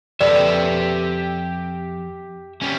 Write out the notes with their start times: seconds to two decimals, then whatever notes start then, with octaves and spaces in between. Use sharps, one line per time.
0.21 F2 G4 A4 B4 D5 E5
2.62 G3 C#4